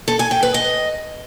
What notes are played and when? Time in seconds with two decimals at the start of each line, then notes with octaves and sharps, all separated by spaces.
0.08 A4
0.19 G#5
0.31 G5
0.43 B4
0.54 D#5